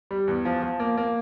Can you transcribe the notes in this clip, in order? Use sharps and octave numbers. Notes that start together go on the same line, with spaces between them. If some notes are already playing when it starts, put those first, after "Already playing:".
G3
E2
F3
F3
A#3
A#3